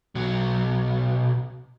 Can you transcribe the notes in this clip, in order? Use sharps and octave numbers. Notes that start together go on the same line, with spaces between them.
B1 F#3